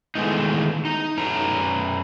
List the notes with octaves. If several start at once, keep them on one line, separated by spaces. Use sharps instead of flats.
D#3 E3 G#3 A3 B3 D#4
D#4
F#2 B4 A#5